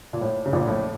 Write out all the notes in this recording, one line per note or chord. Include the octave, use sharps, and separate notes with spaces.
A#2
A2
C#3
A#1 A#2
A2